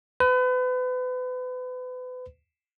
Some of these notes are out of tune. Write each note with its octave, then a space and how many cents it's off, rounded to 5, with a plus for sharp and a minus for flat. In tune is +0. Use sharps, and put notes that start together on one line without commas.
B4 +35